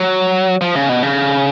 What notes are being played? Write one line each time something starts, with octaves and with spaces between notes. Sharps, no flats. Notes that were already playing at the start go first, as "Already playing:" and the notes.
Already playing: F#3
F3
C#3
B2
C#3